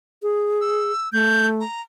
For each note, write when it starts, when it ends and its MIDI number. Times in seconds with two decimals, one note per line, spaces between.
0.23 0.92 68
0.61 1.11 88
1.13 1.62 57
1.13 1.47 91
1.60 1.81 82